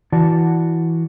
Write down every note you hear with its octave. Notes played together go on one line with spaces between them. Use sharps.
E3 E4 F#4 D5 A5